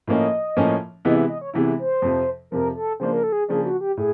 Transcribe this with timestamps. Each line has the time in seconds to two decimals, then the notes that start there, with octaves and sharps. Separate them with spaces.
0.07 A2 F3 A#3 C#4 D#5
0.57 A2 F3 A#3 C#4
1.05 C3 E3 G#3 B3 E4 D#5
1.17 E5
1.29 D#5
1.41 C#5
1.54 C3 E3 G#3 B3 E4
1.79 C5
2.02 F2 C3 F3
2.51 F2 C3 F3 A#4
2.76 A4
3.00 C#3 F3 A#3 D4 C5
3.13 A#4
3.23 A4
3.32 G#4
3.49 C#3 F3 A#3 D4 G#4
3.66 F#4
3.81 G4
3.97 A2 G#4